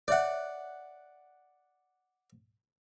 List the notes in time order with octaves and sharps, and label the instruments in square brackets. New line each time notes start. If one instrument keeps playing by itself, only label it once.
[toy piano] C#5 E5 [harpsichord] D5 F#5